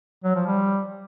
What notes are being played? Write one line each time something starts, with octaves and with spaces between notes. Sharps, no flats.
F#3
F3
G3